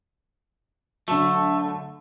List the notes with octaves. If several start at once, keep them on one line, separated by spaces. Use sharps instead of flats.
D3 F#3 A3